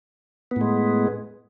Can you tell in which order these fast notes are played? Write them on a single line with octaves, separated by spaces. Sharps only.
B3 A2 G#3